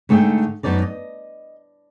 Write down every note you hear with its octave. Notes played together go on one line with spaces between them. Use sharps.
G#2 D3 A3 G#4 E5 G5
F#2 B3 D#4 D5 A5
D#5